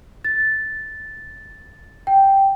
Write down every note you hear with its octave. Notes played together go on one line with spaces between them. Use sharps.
A6
G5